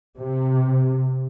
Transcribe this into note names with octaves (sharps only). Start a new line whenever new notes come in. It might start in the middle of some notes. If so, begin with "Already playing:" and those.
C3